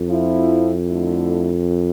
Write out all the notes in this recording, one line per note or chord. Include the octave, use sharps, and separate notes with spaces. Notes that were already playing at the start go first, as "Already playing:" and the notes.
Already playing: F2
F3 C4 E4
D3 A3 E4